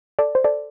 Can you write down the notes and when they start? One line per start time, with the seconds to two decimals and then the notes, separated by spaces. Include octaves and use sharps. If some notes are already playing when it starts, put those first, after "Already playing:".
0.19 A4 D5
0.35 C5
0.44 A4 D5